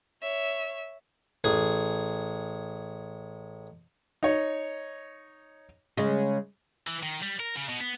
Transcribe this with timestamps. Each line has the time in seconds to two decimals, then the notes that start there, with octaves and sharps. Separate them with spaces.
0.20 C#5 E5
1.44 A1 G#4
4.23 D#4 C#5
5.97 C#3 G#3
6.87 E3
7.03 D#3
7.22 G3
7.40 A#4
7.56 C#3
7.69 B2
7.80 B3